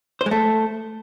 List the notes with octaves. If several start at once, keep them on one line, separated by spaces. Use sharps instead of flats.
C5
G#3
A3